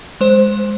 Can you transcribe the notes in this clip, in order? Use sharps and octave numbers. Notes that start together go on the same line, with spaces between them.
G#3 C5